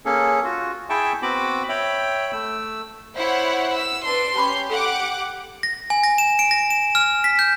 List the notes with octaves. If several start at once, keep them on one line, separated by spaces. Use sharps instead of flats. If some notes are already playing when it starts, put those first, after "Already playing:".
A#3 C#4 G#4 A4
F4 F#4
E4 G#4 E5 G5 A5 C#6
B3 C4 F#4 B5 D6
C#5 E5 G5 B5
A3 E6
E4 C5 C#5 F5 F#5
E6
D4 B4 C6
C#4 G4 A5 B5 C6 D6
A4 F5 F#5 D6
A#6
G#5
A#6
E7
D7
A#6
E7
F6
B6
G6